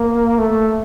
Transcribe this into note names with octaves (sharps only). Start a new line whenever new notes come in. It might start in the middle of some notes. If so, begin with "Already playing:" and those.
Already playing: A#3
A3